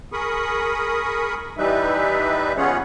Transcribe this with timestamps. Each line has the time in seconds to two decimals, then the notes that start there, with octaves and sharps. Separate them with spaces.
0.12 G#4 A#4 B5 C#6 D#6
1.58 E3 G3 D#4 B4 E5
2.57 B3 C#4 F4 G#4 C#5 F#5